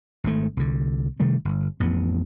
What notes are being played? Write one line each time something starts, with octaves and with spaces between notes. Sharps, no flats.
G#1 G#2 A3
C2 D3
C3 D#3 G3 A3
G1
A1 F2 B3